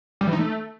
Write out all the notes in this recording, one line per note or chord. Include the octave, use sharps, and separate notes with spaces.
G3
E3
D#4
A3